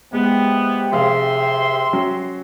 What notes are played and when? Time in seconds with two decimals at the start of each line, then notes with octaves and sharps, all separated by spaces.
0.13 C3 G#3 B3 G4
0.92 F1 G#4 E5 F5 C6
1.93 F#3 C#4